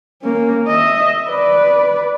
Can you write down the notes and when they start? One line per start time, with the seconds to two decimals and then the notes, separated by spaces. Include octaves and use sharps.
0.22 A#3 C#4
0.68 D#5 E5
1.29 B4 D5